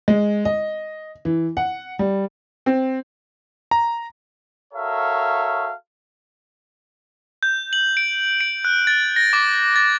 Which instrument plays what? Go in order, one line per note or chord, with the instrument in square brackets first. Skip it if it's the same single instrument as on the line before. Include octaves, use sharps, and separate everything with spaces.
[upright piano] G#3
D#5
E3
F#5
G3
C4
[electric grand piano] A#5
[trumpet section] F#4 A4 A#4 C#5 E5 F5
[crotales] G6
F#7
D7
D7
F#6
A6
A#6
D6
A6